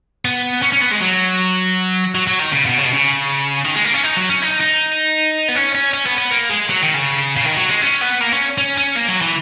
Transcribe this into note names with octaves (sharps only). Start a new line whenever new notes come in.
B3
C#4
C#4
B3
G#3
F#3
F#3
F#3
D#3
C#3
B2
C#3
B2
C#3
D#3
G#3
A#3
C#4
D#4
F#3
C#4
D#4
D#4
B3
C#4
C#4
C#4
B3
B3
A#3
G#3
F#3
D#3
C#3
C#3
D#3
F#3
G#3
C#4
B3
A#3
C#4
C#4
C#4
A#3
F#3
E3